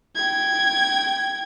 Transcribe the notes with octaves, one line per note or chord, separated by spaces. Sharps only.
G5 G#6